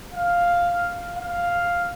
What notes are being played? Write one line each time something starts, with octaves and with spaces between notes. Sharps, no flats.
F5
F5